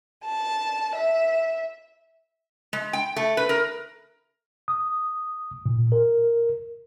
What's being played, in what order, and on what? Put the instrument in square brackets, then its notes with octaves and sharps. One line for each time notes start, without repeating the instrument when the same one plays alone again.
[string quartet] A5
E5
[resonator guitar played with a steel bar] G#3
G5
A3
B4
A#4
[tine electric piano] D#6
A#2
A#4